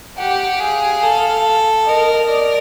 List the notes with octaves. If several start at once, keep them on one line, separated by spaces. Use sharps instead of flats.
G4 F#5
G#4 F5
A4
A#4 D#5
D5